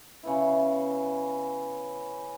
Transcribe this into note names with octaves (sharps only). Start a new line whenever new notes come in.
C#3 B3 E4